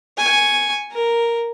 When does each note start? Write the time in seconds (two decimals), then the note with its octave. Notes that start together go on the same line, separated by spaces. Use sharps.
0.18 G#5 C#6
0.92 A#4